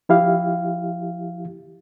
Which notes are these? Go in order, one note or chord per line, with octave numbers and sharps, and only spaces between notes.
F3 E4 G4 F5